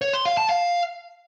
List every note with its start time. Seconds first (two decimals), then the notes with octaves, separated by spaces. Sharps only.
0.01 C#5
0.13 C6
0.25 F5
0.37 A5
0.49 F5